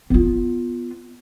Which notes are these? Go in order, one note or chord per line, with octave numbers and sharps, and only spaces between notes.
B3 F4